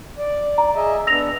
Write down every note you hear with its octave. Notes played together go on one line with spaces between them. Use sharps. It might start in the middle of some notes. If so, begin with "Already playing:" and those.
D5
A#5
G#4 D#5 E5
B3 D4 E6 A#6 F7